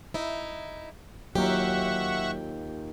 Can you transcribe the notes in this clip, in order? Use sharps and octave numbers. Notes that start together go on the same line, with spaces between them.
D#4 E4
D#2 F#3 F4 G4 E5 F#5 A#5 C#6